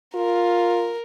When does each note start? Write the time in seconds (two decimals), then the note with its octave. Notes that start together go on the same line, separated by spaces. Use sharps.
0.15 F4 A#4